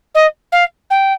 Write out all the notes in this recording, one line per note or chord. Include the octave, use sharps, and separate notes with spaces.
D#5
F5
G5